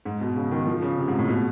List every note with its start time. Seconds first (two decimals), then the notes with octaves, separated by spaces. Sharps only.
0.05 G#2
0.21 B2
0.36 C#3
0.51 D#3
0.67 F3
0.82 C#3
0.98 C3
1.08 G#2
1.19 A2
1.28 B2